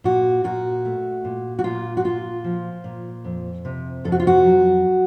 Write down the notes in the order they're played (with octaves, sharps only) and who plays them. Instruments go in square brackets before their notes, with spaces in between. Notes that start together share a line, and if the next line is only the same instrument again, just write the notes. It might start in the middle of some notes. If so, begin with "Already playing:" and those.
[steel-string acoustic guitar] A#2 F#4
A#2 F#4
A3
A#2
F#4
A#2 F4
F#4
A#2 F4
F3
A#2
F2
C3
F2 A4
F#4
F4
F#4
F#3